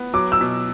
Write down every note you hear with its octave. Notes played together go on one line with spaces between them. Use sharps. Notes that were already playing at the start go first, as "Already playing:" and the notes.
Already playing: B3
F#3 D6
E6
B2